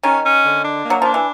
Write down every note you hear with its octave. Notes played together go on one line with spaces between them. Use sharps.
D#3 C#4
C#4
D3
D4
A#3
F#3
F3 D4
E3